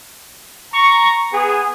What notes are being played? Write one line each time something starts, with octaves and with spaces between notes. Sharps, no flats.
A#5 C#6
B3 G#4